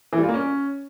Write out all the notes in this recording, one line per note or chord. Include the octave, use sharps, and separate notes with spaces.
E3
G3
F4
A#3
C#4